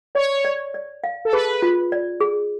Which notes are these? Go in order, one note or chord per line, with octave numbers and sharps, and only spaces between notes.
C#5 D5
D5
D5
F5
A4
G#4 B4
F4
D5
G#4